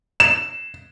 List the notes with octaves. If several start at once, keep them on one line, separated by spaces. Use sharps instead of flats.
E7